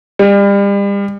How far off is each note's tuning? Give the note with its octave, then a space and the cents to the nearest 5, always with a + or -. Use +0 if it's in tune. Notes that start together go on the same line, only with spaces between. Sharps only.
G3 +35